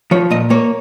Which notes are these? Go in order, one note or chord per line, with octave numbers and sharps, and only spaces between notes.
F3 C#5
A#2 D#5
A#3 C#5